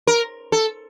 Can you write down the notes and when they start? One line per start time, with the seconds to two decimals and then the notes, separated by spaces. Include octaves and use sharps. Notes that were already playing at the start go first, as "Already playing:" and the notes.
0.07 A#4
0.52 A4